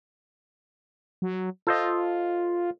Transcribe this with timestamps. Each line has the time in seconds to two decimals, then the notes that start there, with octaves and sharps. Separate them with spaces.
1.22 F#3
1.67 F4 A4 C5 D#5